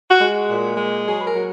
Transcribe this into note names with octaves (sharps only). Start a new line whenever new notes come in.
F#4
G#3
A#2
G#3
F#3 G#4
B4
A#4
F#3